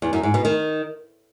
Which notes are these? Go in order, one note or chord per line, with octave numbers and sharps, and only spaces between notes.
E2
F#2
G#2
B2
D#3